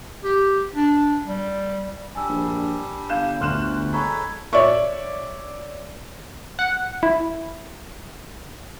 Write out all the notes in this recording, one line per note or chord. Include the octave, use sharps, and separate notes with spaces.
G4
D4
G3
G3 D4 G#5 E6
A#1
G1 F5 G6 E7
D2 C6 F6 F#6 E7
G#3 A4 C#5 A#5 B5 C#6
C#5 D5 E5 C#6
F#5
E4